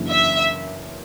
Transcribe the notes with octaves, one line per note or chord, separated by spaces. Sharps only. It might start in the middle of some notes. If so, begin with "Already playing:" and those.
Already playing: F#2 C#3 E3 A#3 D4
E5